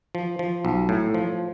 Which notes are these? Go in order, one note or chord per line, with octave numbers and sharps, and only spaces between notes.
F3
F3
B1
A2
F3